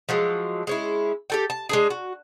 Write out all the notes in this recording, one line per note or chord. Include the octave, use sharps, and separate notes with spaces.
F3 F#3 G#3
G#3 C#4 E4
G4 A4 G5
A5
G#3 D4 G#4
F#4